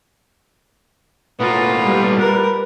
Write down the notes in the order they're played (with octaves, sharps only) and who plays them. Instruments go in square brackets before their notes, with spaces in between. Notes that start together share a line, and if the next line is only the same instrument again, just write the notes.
[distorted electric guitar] A2 A#3 [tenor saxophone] B3 [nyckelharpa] F4
[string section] G3
[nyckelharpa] A#4 [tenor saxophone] B4